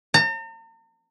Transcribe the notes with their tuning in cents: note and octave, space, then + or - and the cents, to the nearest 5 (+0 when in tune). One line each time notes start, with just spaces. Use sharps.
A#5 -45